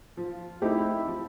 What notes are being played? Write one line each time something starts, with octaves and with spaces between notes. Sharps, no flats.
F3 F4
A3 C4 D#4 E4 G4
F3